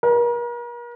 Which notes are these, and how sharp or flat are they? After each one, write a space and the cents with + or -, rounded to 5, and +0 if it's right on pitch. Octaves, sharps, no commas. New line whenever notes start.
A#4 +40